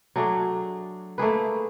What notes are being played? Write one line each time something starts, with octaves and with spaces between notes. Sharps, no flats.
F#3 A3 D4 G#4
A3 A#3 G#4 B4